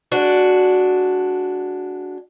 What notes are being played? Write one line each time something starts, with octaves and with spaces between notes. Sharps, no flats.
G#3 D4 F#4